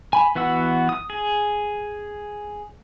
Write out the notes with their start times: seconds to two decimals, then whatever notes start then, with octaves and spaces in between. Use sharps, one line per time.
0.13 G#5 B5
0.35 E3 B3 F#4 F#5 E6
0.89 D#6
1.10 G#4